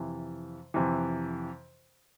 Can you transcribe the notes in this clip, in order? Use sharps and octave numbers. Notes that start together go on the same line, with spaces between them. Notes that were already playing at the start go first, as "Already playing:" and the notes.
Already playing: F2 C3 E3
F2 C3 E3